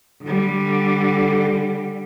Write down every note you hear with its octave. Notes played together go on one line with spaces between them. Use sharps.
D3 G3